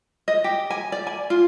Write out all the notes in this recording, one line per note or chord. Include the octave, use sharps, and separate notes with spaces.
D#5
G4
G#5
D5
G#5
F4